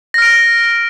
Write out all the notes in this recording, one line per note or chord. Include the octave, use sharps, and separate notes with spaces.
F6 A#6 D7